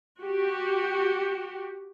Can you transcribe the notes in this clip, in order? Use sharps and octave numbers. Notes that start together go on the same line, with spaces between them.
F#4 G4